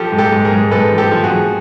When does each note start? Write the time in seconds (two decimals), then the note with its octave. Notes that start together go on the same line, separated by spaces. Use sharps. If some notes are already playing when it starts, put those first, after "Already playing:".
Already playing: F3 G4 A4
0.12 G#2
0.18 G4 A4
0.32 G#2
0.45 G#4 A#4
0.52 G#2
0.71 G#2 A4 B4
0.91 F3
0.98 G4 A4
1.11 F3
1.24 F#4 G#4
1.30 F3